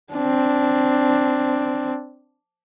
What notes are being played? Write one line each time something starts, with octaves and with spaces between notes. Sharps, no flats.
C4 D4